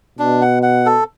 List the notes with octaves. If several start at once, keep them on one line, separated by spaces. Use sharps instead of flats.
B2 D4
F#5
F#5
A4